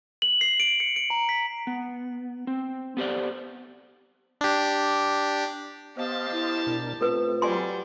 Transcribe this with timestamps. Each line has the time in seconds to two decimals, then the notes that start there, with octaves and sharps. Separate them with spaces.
0.22 F#7
0.41 C7
0.60 D7
0.80 C#7
0.96 D7
1.10 A#5
1.29 B6
1.67 B3
2.47 C4
2.97 B3 G4 C5 D5
4.41 D4 G4
5.97 B3 G4 C5 D#5 F5 A5
6.32 E4
6.67 B2 D4 A#4
7.01 A3 C4 F4 A4 B4
7.42 F#3 G3 D5 G#5 C6